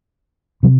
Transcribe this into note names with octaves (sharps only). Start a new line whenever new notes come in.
C3 F#3